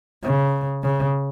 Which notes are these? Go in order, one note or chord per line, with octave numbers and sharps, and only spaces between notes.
C#3
C#3